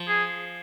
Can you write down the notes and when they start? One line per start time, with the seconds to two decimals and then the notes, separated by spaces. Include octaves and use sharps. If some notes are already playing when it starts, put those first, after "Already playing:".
Already playing: F3
0.08 G#4